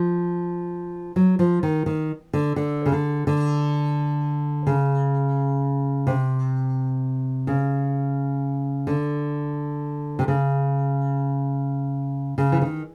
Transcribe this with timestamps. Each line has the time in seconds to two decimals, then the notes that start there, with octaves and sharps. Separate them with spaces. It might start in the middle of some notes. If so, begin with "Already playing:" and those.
Already playing: F3
1.16 F#3
1.39 F3
1.63 D#3
1.86 D#3
2.33 D3
2.56 D3
2.86 C#3
2.92 D3
3.27 D3
4.67 C#3
6.07 C3
7.47 C#3
8.87 D3
10.19 C3
10.28 C#3
12.38 C#3
12.52 E3
12.62 D#3